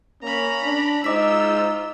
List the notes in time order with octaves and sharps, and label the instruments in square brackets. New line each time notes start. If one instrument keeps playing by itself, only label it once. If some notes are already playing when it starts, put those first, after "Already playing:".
[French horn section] A#3 C#5 [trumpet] C#4 [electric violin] A#5 B5
[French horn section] D4
[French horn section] G#3 C5 [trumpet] D#4 [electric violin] F4 E6 [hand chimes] D#5 D6 B6